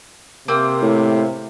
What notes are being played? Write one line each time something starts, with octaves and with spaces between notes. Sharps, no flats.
C3 A#3 C4 D#6
A2